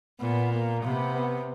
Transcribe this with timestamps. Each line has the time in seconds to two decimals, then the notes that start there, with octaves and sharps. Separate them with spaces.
0.19 A#2 B3
0.51 A#3
0.83 C3 B3
1.15 B3